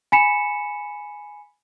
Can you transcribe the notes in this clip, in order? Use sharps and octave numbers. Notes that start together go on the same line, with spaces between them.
G#5 B5 B6 C#7 E7